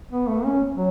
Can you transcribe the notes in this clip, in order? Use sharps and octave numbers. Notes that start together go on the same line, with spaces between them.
B3
A3
C#4
F#3